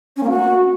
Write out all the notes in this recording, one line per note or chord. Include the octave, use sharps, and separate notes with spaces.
C#4
A#3
F#4